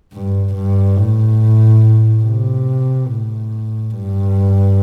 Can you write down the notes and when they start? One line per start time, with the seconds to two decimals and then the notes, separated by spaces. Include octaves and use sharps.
0.13 G2
0.54 G2
0.96 A2
2.23 C3
3.07 A2
3.91 G2